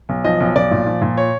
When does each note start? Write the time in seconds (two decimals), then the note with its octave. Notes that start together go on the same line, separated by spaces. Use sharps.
0.09 B1
0.24 F3 D#5
0.40 B1
0.55 B1 D5
0.71 A#2
0.87 F3
1.02 A#2
1.18 C#5